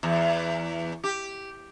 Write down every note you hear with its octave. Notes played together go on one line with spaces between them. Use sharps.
E2
G4